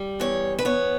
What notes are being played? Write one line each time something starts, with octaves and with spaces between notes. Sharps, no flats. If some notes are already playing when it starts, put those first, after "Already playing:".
Already playing: G3
E2 C#5
B4
B3 C#5